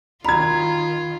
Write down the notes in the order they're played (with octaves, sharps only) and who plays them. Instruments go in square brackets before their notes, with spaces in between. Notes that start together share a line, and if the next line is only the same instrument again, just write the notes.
[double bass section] D#3 [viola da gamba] F4 [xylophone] A#5 [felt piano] B5 G#6